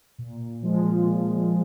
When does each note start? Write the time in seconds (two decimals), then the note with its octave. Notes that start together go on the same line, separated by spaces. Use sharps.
0.18 A#2
0.63 F3 G#3 F4
1.06 A#2